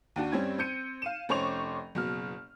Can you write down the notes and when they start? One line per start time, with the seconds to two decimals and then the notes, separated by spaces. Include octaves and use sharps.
0.16 D#2 D4 F#4
0.32 G2 G3 C4 C#4 G#6
0.58 C4 G6 C#7 D#7
1.02 F5 D#7 E7
1.29 F1 C#4 C5 C#6 D6 F7
1.95 F#1 B2 F6